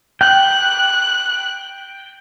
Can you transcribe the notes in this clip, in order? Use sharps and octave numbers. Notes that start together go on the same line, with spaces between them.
G5 F#6